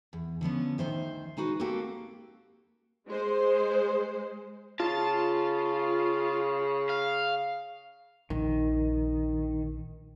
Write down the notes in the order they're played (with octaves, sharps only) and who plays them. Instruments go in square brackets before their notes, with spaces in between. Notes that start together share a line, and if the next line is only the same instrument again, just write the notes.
[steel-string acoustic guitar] E2
D3 F3 B3 C#4
D2 C3 D#3 C5 E5
G#3 D#4 F#4 B4
A#3 C4 F#4 G4 A4 A#4
[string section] G#3 C5
[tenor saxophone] C#3 [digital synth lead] F4 [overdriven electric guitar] A5
[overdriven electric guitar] F5
[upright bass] A#1 [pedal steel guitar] D#3